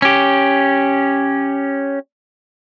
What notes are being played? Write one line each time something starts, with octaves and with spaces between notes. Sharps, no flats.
C#4 G4